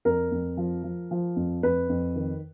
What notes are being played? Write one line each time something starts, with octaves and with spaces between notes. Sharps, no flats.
F2 A#4
F2
F3
F3
F3
F2
F2 B4
F2
D#3